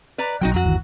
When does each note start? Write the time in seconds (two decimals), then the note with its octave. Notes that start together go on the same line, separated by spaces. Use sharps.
0.18 B4 D5 A#5
0.41 B1 F#3 D#4 F#4 G5
0.54 F2 F#3 F#4
0.65 G1 D#2 E3